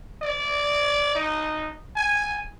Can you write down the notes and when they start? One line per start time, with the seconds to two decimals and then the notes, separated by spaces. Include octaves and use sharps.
0.22 D5
1.15 D#4
1.96 G#5